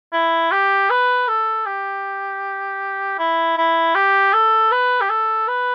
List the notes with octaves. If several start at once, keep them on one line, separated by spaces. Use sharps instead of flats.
E4
G4
B4
A4
G4
E4
E4
G4
A4
B4
G4
A4
B4